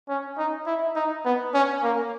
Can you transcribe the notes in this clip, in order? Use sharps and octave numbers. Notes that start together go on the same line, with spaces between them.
C#4
D#4
E4
D#4
B3
C#4
A#3